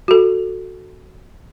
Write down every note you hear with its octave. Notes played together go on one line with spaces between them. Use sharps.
F#4 A4